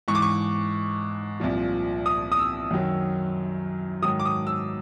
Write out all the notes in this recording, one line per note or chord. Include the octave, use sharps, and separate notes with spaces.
G#2 E3 C#6
D6
C#6
C2 A#2 F3
D#6
D#6
E6
F#2 D#3 F#3
G#2 D#3 F#3 D#6
D6
D#6
E6